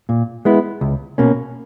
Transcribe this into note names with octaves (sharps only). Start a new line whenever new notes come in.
A#2
G#3 B3 E4
C#2
B2 A#3 C#4